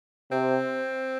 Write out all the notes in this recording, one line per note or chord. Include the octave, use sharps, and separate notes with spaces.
C3 C4